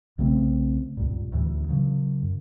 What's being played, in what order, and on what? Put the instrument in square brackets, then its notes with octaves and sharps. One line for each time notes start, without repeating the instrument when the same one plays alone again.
[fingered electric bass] B1 C#3 A3 C4
C#2 G2 A#2
D2 A2 E3
C#3 F#3
F#2